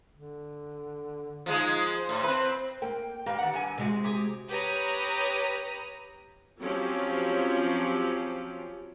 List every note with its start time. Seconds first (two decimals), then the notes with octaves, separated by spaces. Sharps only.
0.13 D3
1.46 F3 G#3 D#4
1.95 C5
2.09 A2
2.23 C4 B4
2.82 A#3 G5
3.26 A#3 G4 B4
3.38 D#3 F#5
3.53 G2 G#5
3.78 C3 G#3 F#4
4.04 G4 G#4
4.48 G4 B4 C#5 A#5 D#6
6.61 F3 F#3 C4 C#4 G4